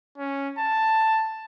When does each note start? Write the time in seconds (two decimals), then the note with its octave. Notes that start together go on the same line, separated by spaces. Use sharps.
0.18 C#4
0.58 A5